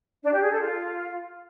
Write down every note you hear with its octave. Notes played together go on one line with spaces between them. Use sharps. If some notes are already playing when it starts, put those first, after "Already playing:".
D4
G4
G#4
A4
F4